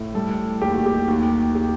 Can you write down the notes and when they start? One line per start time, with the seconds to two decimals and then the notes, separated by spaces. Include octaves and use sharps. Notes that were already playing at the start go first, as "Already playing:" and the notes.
Already playing: A2
0.15 G3 A4
0.61 D#2 G4
0.73 F#4
0.86 G4
1.08 D#2 F#4
1.55 G4